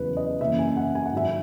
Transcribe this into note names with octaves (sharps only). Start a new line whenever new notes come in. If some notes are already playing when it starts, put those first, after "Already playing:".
Already playing: E2 C#3 F#3 B4
D#5
F#2 C#3 E3 A#3 E5
G#5
F#5
G#5
F#5
G#2 D#3 F#3 E5